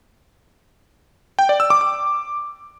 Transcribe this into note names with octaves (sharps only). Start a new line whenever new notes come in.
G5
D5
E6
D6
D6